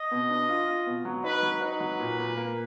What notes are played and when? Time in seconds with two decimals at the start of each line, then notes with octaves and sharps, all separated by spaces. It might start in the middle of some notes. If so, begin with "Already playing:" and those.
Already playing: D#5
0.11 B2
0.30 D4
0.49 F4
0.68 F4
0.86 B2
1.05 F#3
1.24 D#4 B4
1.43 F#3
1.52 B4
1.61 D#4
1.80 F#3
1.99 A#2
2.18 A#2
2.37 A#3